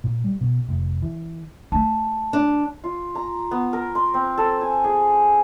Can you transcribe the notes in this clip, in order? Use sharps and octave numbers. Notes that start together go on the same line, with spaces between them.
A#2
G3
B2
F1
E3
A3 A5
D4
F4
A#5
B3
A#4
C6
C4
A4
G#5
G#4